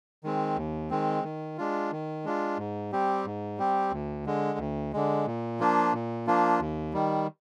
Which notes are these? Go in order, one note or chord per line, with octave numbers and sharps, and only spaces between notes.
D#3 G#3 C4
D#2
D#3 G#3 C4
D#3
G#3 D4 F4
D#3
G#3 D4 F4
G#2
G3 C4 G4
G#2
G3 C4 G4
D2
D3 G#3
D2
D3 G#3
A#2
F3 A#3 D4 F4
A#2
F3 A#3 D4 F4
D#2
D#3 G3